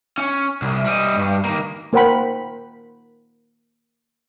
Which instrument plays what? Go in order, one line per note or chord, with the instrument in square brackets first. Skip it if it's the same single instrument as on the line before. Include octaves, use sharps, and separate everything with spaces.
[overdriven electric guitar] C#4
C2
G3 D#5
G2
D#3 A#3
[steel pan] A#3 A#4 C5 F#5 G5 B5